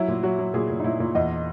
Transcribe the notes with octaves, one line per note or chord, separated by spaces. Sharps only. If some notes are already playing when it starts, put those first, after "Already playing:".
Already playing: F#3 E4
A#2
F#3 F#4
F#3
A#2 G#4
A#2
D#4
A#2 E4
A#2
E2 D#5